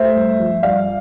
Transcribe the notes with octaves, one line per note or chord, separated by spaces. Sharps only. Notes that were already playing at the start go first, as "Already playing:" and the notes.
Already playing: A3 C5 E5
G2
F3
G2 D5 F5